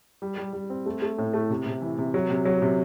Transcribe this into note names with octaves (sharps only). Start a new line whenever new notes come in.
G3
G3
G3
C4
A3
A3
A2
A3
C3
C3
E3
C3
F#3
C3
F#3
C3